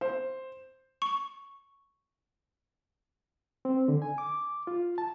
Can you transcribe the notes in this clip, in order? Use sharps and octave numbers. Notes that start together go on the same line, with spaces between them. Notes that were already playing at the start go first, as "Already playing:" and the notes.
C5
C#6
C4
D3
G#5
D6
F4
A5